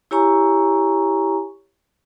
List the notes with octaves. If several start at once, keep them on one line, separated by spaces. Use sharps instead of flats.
E4 G4 C#5 G#5 A#5 C#6